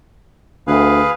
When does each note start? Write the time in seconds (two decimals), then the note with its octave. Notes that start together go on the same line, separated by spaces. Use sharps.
0.67 D2 G#4 B4 F5